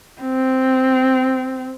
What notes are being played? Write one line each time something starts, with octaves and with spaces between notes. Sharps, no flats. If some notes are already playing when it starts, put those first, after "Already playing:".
C4